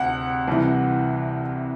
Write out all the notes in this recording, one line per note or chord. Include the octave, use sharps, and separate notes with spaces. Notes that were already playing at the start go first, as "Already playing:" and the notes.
Already playing: D2 C3 F#5
C2 C3 E3